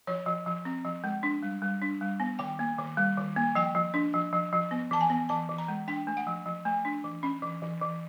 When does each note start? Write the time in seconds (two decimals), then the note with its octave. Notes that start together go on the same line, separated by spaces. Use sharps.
0.07 F3 C#5
0.26 F3
0.46 F3
0.65 C4
0.85 F3
1.04 G#3
1.23 D4
1.43 G3
1.62 G3
1.82 D4
2.01 G3
2.20 B3
2.39 D#3 G5
2.59 A#3
2.78 D#3
2.97 G3
3.17 D#3
3.36 A#3
3.55 F3 G5
3.75 F3
3.94 D4
4.14 F3
4.33 F3
4.53 F3
4.71 B3
4.91 E3 A5
5.01 G#5
5.10 B3
5.29 E3 A5
5.49 E3
5.58 A#5
5.68 G#3
5.88 D4 G5
6.07 A3
6.17 F#5
6.27 F3
6.46 F3
6.65 A3
6.85 D4
7.04 E3
7.23 C#4
7.42 E3
7.62 E3
7.81 E3